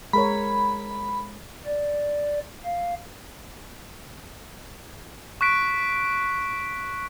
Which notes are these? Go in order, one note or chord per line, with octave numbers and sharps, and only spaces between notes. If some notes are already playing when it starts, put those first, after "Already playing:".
G#3 A#4 C#5 B5
D5
F5
C#6 F#6 B6 D7